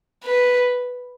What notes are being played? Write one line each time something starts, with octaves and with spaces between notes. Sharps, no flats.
B4